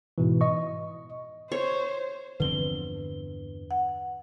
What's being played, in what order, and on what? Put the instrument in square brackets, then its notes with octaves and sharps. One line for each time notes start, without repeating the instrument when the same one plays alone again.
[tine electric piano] G#2 B2 E3
D#5 C#6
[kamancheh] C5 [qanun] C#5
[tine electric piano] E2 G2 [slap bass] D3 F3 C4 [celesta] B4 G7
[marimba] F#5